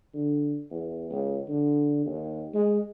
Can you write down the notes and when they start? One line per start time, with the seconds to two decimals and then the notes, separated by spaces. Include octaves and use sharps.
0.14 D3
0.71 E2
1.11 C#2
1.49 D3
2.06 D#2
2.54 G#3